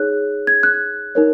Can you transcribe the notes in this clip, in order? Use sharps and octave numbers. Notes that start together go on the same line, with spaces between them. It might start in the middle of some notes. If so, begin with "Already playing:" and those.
Already playing: D#4 G#4 C#5 F#6
G#6
F#6
D#4 A#4 C#5